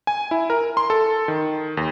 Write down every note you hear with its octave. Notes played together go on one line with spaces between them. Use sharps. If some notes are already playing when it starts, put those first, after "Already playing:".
G#5
E4
A#4
C6
A4
D#3
D#2